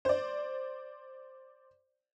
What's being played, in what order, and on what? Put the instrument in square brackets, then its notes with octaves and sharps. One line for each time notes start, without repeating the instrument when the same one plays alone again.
[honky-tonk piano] C5 D5